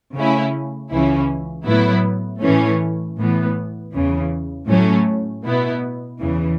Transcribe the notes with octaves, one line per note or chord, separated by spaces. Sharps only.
C#3 A3 C#4 E4
C#2 C#3 E3 C#4 E4
A2 F#3 B3 E4
A2 E3 A3 C#4
A2 E3 B3
E2 C#3 E3
A2 F#3 A3 C#4
B2 B3 E4
E2 C#3 E3